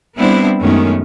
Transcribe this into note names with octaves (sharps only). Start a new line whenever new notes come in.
G3 B3 C4 D4 E4
F#2 D#3 G#3 A3 B3 C#4